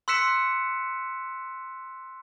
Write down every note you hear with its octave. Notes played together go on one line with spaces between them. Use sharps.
C6 E6 F#6 B6 C#7 E7